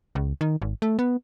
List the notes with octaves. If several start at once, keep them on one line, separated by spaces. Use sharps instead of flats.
C#2
D#3
G#1
A3
B3